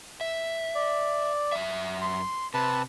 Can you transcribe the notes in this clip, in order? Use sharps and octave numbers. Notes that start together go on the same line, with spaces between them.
E5
D5
F#2 E5
C6
C3 B4 A5